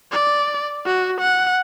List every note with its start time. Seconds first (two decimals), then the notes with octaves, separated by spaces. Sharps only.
0.12 D5
0.86 F#4
1.21 F#5